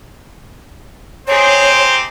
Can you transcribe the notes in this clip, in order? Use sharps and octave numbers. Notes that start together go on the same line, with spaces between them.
C4 D#4 G4 G#4 C5 C#5